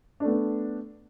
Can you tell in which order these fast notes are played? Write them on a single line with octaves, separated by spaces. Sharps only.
D4 A3 B3